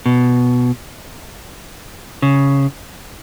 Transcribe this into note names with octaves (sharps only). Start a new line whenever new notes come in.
B2
C#3